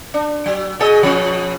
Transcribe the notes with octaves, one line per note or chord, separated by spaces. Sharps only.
D4
F#3
B2 G#4 D#5
B2 F3 C#4